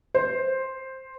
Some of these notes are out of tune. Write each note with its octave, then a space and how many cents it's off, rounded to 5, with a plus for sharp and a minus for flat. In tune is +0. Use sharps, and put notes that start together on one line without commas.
C5 +5